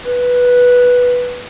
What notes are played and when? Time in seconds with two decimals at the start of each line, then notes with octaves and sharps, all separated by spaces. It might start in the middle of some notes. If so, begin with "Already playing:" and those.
0.05 B4